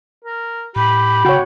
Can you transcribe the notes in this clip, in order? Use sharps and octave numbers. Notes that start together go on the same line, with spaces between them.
A#4
A2 G4 B5
C#3 F#4 C#5 G5